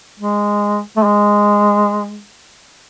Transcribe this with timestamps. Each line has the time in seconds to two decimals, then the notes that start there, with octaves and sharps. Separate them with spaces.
0.20 G#3
0.97 A3
1.04 G#3